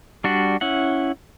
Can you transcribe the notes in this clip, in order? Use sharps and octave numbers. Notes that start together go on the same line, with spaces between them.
G3 D4 F#4
C#4 E4 F#5